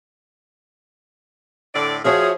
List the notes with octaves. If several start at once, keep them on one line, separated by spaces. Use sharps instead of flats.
A2 D3 D5
F3 F#4 G#4 C#5 E5